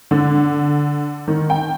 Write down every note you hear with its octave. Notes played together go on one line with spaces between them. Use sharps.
D3
D#3
G5